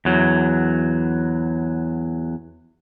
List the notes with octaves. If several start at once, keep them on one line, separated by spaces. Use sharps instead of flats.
E2 F#3